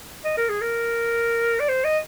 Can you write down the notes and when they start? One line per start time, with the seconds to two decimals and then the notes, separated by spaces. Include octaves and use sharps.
0.25 D#5
0.37 A#4
0.49 G#4
0.61 A#4
1.60 D5
1.69 C5
1.85 D#5